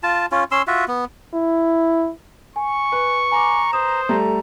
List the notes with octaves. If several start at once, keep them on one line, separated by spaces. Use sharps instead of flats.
F4 A5
C#4 F4
C#4 C6 E6
F4 F#4 E5
B3
E4
G#5 C#6
B4
G#5 A#5 D6
C5 D#6 E7
G3 A3 A4 A#5